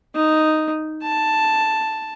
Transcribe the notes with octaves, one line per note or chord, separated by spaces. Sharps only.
D#4
A5